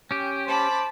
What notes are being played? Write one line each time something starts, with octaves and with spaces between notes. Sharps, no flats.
C#4 G4 G5
C5 A5 B5 D6